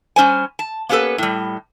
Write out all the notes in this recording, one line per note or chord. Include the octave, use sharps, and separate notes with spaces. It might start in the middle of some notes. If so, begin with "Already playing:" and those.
G3 C#4 C5 G#5
A5
A#3 B3 C#4 G4 A4 B4
A2 G3